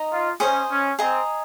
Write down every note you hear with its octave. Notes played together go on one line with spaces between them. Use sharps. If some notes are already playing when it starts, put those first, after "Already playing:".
Already playing: D#4 D#5 A#5
F4
C#4 G#4 C5 D#5
C#4
C4 G#4 D#5 A#5